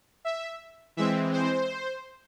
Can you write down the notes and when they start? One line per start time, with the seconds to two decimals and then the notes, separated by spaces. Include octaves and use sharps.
0.25 E5
0.97 E3 G#3 C4 E5
1.33 C5